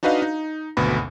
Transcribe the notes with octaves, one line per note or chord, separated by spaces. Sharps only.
D4 D#4 F#4 B4 D#5 F5
D#4
G#1 D2 B2 B4 B5